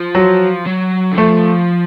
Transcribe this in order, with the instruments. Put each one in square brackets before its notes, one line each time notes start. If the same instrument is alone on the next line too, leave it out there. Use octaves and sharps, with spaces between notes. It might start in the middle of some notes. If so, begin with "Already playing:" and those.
Already playing: [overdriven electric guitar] F3
[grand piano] F#3
[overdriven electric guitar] F#3
D3
[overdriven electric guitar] F3 [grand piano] A3